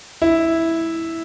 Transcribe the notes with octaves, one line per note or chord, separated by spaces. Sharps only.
E4